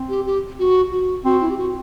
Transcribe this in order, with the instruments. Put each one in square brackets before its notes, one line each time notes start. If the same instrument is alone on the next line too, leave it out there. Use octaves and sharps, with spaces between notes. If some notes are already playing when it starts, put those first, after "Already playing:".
Already playing: [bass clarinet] C4
[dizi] G4
G4
F#4
F#4
[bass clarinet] C4 [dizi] F#4
[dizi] E4
G4
F#4